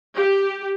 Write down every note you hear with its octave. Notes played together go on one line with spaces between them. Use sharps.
G4